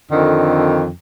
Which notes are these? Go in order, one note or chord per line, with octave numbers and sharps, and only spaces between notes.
F2 D3 D#3